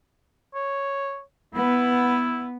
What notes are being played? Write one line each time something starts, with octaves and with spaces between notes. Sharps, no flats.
C#5
B3 E4